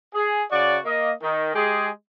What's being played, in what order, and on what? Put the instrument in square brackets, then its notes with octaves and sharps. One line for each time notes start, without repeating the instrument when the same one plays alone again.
[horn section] G#4
C#3 F#4 D5
A#3 D#5
D#3
G#3 G4 G#4